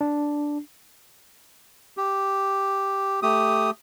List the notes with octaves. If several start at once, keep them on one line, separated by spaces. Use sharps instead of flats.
D4
G4
A3 G4 D#6